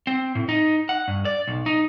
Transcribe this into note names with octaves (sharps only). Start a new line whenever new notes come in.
C4
A2
D#4
F#5
G2
D5
B1
D#4